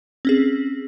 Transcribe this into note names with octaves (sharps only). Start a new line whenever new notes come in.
C4 C#4 G#4